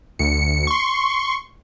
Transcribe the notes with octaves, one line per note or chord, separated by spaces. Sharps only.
D2 C#7
C6 C#6